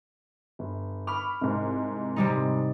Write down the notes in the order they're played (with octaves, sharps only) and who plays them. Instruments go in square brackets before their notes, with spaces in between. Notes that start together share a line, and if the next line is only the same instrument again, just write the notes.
[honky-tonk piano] G1
[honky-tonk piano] B5 C#6 D6 [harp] F6
[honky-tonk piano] C2 G#2
[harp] C3 G3 D#4